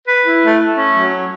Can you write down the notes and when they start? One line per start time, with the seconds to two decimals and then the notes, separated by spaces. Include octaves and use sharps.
0.08 B4
0.25 E4
0.44 A3
0.61 A3
0.78 C#4
0.94 F#3